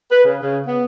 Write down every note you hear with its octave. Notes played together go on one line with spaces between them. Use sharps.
B4
C#3
C#3
B3